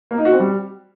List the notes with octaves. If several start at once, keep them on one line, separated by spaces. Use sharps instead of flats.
A#3
D#4
F#4
C4
G3